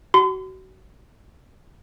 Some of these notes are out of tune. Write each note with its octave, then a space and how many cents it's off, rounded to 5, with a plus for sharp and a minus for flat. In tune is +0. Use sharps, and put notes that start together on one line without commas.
F#4 +30 C6 -45